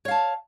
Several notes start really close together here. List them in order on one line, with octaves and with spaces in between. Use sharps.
C#5 F5 A5